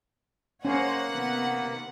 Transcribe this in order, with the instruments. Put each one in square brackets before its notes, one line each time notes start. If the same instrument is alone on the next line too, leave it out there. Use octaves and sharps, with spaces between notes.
[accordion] A#3 [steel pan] C#4 [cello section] C5 C#5 D#5 [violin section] F#5
[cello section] C3 D#3 B3